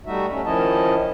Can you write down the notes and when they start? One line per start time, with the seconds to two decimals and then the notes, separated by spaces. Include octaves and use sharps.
0.06 G3 A3 D#4 F#4 E5
0.30 A3 C#4
0.45 D#3 F3 C#4 E4 D#5 A5